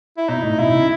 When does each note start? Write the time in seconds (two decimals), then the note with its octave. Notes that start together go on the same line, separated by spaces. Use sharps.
0.18 E4
0.29 B2 D#4
0.43 A2
0.59 B2 E4
0.70 C3
0.79 C#3